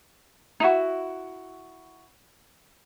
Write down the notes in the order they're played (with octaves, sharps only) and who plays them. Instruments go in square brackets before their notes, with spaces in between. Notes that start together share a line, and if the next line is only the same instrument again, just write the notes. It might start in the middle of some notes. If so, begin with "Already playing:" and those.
[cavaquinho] D#4 E4 F#4